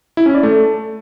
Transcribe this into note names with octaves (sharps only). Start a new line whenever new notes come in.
E4
C#4
D5
A3